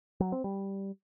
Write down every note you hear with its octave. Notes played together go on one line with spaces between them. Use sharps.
F#3
C4
G3